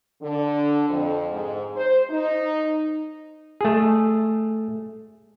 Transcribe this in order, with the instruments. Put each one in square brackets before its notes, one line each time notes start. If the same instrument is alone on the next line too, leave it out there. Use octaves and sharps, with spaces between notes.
[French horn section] D3
F2
G#2
C5
D#4
[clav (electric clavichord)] A3 G#4